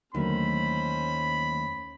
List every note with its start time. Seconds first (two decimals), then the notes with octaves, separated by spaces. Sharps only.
0.15 D#2 D3 F#3 A3 C#4 C5 B5